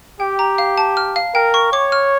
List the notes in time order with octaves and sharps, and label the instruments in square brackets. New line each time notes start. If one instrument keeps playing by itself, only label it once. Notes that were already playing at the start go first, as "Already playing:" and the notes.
[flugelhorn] G4 [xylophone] G5
[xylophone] A#5
F5
A5
F6
F5
[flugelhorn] A#4 [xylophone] G5
[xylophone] C#6
[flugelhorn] C#5 [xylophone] D6
[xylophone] F6